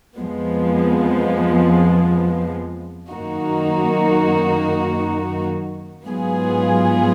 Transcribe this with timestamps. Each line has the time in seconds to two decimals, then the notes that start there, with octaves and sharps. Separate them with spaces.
0.16 F2 F3 G#3 B3
3.11 F#2 D#3 A#3 D#4 F#4
6.05 G#2 F#3 B3 F4 G#4